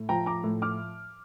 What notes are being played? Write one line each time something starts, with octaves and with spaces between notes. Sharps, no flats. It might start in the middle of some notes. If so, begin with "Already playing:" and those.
Already playing: A2
F3 G5 A#5
A#5 D6
A2
D6 F6